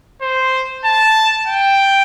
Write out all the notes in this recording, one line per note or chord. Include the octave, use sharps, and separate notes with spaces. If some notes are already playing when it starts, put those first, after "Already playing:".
C5
A5
G5